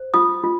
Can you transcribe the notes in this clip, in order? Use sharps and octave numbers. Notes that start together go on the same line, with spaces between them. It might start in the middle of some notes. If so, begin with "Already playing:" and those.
Already playing: C5
F4 D#6
F4